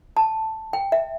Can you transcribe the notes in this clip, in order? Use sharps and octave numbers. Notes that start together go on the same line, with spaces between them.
A5
G5
E5